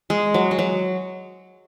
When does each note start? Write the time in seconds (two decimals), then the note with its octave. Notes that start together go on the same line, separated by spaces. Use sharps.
0.10 G#3
0.34 F#3
0.51 G#3
0.59 F#3